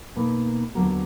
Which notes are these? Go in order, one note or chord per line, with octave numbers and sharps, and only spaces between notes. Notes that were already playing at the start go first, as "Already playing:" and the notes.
B2 A#3 D#4 B4
D#2 D3 F#3 B3 A#4